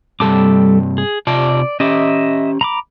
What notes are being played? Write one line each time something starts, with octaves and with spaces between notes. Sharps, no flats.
G2 C3 G3 A4 A5 D6
G#4
C3 F4 D5 A5
C#4 G4 D#5 E5 D6
A#5 B5 D6